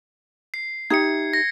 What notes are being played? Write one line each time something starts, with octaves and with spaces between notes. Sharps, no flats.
C7
D#4 G4 E5 G#6 C#7
A#6